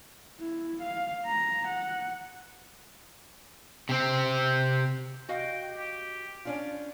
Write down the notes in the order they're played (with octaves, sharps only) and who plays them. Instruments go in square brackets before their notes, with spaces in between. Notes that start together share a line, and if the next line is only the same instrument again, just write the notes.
[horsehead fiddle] E4
F5
A#5
F#5
[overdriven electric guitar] C3 C4
[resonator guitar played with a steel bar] F#4 D#5 F5 [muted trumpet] G5
[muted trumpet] G4
[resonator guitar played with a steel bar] C#4 D4 F4